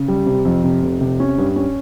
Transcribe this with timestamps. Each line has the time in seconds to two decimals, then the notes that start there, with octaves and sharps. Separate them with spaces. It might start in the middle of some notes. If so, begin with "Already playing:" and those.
Already playing: C#3
0.08 G3
0.26 C3
0.45 F2
0.64 C3
0.83 F1
1.01 C3
1.20 C#4
1.38 G2
1.56 C#4